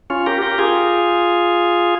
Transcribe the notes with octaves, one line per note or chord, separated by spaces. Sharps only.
C#4 F4
G4 A#4
G4 A#4
F4 G#4